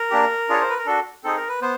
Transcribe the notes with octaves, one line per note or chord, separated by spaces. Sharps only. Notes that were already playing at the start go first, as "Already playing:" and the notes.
Already playing: A#4
A#3 D4 G4
D4 F4 G#4 C#5
C5
B4
A#4
D4 F#4 A4
C4 D#4 G#4 A4
A#4
B4
B3 C5